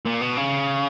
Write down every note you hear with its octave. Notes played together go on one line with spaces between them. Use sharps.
A#2
B2
C#3